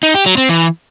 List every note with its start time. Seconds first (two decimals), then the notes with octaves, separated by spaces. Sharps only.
0.03 D#4
0.14 G4
0.26 F#3
0.38 C4
0.49 E3